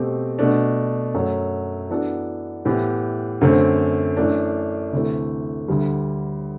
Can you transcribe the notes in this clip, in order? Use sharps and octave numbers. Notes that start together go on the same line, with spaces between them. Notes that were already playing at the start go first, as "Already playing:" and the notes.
Already playing: B2 A3 C4 G4
B2 A3 D4
F#2 F#3 A3
E3 B3 D4 F#4 A4
A2 E3 B3 E4 G4
F#2 D3 A3 C4
F#2 E3 A3 D4
D2 C3 E3 A3
D2 D3 G3